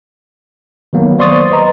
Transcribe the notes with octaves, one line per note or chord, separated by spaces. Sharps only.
D#3 F#3 A#3 B3
C5 D5 C6 C#6 D#6 A6
B4 D#5 A#5